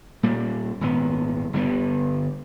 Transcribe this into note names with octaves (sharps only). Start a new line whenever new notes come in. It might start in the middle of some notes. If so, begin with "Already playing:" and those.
A#2 G3 A#3
D#1 G#1 B3
G1 D3 G3 B3